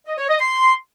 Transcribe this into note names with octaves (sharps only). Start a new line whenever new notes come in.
D#5
C#5
D#5
C6